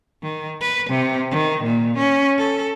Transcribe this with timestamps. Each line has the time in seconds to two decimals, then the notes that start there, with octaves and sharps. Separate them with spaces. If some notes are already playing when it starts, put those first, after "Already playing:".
0.23 D#3
0.61 B4
0.90 C3
1.31 D#3
1.64 A#2
1.98 C#4
2.38 A4